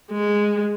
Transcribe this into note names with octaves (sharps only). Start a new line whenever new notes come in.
G#3